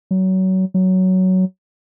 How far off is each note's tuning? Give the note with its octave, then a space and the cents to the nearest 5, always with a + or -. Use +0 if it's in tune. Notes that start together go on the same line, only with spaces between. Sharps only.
F#3 +25
F#3 +10